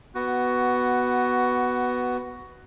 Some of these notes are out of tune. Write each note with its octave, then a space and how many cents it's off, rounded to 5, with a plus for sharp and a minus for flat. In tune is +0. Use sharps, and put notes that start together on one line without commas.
B3 +0 F#4 +10